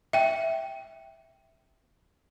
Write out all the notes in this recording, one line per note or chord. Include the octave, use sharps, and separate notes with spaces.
E5 G5